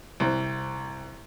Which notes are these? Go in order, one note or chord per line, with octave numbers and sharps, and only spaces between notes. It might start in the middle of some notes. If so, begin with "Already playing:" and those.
C2 C4